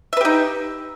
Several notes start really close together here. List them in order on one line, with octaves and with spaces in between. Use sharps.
E5 B4 G4 D#4